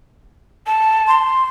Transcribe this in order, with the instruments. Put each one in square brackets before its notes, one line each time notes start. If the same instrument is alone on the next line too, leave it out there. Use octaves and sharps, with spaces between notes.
[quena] A5
[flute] C6